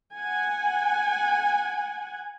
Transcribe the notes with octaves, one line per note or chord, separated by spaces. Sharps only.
F#5 G#5